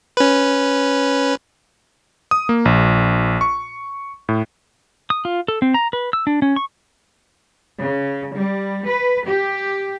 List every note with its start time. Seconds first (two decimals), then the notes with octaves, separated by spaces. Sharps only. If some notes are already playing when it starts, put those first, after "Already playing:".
0.17 C#4 B4
2.31 D#6
2.49 A#3
2.65 A#1
3.41 C#6
4.29 A2
5.10 D#6
5.25 F4
5.48 A4
5.62 C4
5.74 A#5
5.93 B4
6.13 E6
6.27 D4
6.42 C#4
6.56 C#6
7.80 C#3
8.35 G3
8.86 B4
9.27 G4